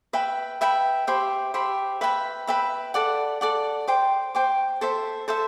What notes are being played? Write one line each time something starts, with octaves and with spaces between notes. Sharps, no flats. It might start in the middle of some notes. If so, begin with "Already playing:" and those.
B4 E5 G5 B5
B4 E5 G5 B5
G4 C5 E5 B5
G4 C5 E5 B5
B4 E5 G5 B5
B4 E5 G5 B5
A4 D5 F#5
A4 D5 F#5
C5 G5 D6
C5 G5 D6
A4 C5 E5
A4 C5 E5